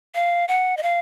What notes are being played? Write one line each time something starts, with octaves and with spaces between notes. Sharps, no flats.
F5
F#5
D#5
F5